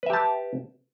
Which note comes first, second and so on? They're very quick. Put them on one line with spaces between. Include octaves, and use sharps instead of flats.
B4 E5 G4 A5